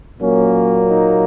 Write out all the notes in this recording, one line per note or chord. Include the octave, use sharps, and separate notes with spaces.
A#2 F#3 A#3 C#4
D#4